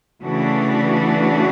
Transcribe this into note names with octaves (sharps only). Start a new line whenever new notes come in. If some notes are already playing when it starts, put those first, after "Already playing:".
C#3 E3 A3 D4 F#4